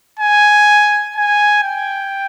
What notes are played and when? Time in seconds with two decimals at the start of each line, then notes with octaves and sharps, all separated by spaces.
0.19 G#5
1.16 G#5
1.63 G5